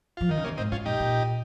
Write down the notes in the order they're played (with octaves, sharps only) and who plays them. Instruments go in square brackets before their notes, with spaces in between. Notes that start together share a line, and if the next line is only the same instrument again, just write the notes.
[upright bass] F3 [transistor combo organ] F4
[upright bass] D#3 [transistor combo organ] D#4
[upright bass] C#3
[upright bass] C3 [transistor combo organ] A#3 C#4
[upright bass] G#2 [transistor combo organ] C4 D#4
[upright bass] G#2 [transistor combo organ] C#4 F4
[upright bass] A#2 [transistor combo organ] D#4 G4
[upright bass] A#2